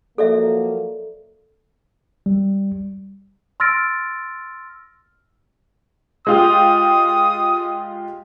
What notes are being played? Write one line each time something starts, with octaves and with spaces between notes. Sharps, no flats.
F3 F#3 A#3 A4 D5 E5
G3
C6 E6 F6 A6 A#6 D7
G#3 F4 G4 D#6